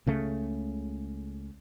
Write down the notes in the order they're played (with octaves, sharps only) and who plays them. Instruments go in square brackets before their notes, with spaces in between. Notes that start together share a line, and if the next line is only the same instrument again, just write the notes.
[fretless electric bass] C#2 C#3 A3